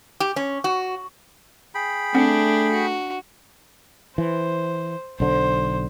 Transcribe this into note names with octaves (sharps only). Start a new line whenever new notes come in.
G4
C#4
F#4
G#4 G5 B5
A3 C4 D4 F#5
F#4
E3 C5
B1 D3 C5